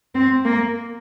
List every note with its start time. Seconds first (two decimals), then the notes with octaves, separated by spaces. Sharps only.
0.15 C4
0.45 A#3